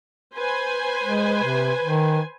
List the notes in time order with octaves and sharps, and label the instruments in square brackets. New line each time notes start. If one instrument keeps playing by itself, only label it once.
[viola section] B4 C5 G#5
[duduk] G#3
C3
D#3